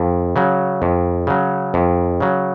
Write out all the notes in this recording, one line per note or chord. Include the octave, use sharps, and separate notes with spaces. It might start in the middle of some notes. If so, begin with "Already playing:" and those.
Already playing: F2
C#3 F#3
F2
C#3 F#3
F2
C#3 F#3